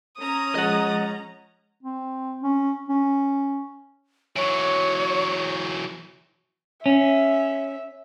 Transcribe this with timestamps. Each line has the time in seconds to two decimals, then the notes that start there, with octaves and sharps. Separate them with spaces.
0.19 C#4 A#5 D#6
0.55 F3 G#3 D#5 F#5 A6
1.83 C4
2.43 C#4
2.89 C#4
4.36 E3 F#3 C#5
6.86 C#4 E5